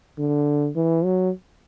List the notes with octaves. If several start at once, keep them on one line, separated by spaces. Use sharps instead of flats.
D3
E3
F#3